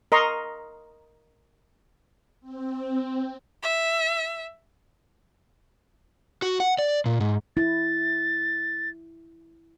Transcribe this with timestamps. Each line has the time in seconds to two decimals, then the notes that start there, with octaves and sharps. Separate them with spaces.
0.12 A#4 D#5 A#5 C6 C#6
2.41 C4
3.63 E5
6.42 F#4
6.60 F#5
6.79 D5
7.06 A#2
7.20 G#2
7.57 E4 A6